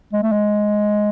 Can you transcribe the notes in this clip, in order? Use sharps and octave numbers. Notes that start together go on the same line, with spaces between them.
G#3
A3
G#3